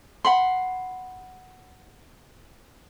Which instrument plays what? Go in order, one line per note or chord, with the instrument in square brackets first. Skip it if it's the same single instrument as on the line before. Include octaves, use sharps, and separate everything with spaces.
[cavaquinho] F#5 B5 C6